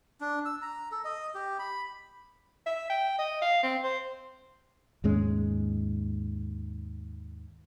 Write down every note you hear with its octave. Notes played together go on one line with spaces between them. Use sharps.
D4
E6
A#5
A4
D#5
G4
B5
E5
G5
D#5
F5
C4
C5
D#2 G#2 G#3 C#4